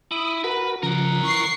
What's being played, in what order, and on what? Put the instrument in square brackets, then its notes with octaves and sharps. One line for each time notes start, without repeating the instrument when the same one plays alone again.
[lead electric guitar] E4 [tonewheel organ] D#6
[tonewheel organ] F#4 A#4 [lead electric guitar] B4
[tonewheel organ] C#3 F3 [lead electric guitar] A#4 F#5
[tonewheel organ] E3 [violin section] C#6 C7